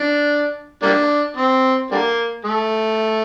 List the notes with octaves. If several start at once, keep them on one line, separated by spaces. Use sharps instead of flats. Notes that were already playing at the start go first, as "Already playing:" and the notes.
Already playing: D4
G3 A#3 D4
C4
D3 G3 A#3
A3